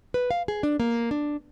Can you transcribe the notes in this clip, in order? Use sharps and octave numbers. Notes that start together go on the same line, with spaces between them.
B4
F5
G#4
D4
A#3
D4